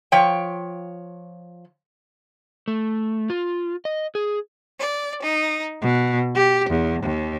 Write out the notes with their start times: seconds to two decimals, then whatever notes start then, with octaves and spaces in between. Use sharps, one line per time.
0.12 F3 C#5 G5
2.68 A3
3.30 F4
3.85 D#5
4.15 G#4
4.80 D5
5.23 D#4
5.81 B2
6.34 G4
6.69 E2
7.03 D#2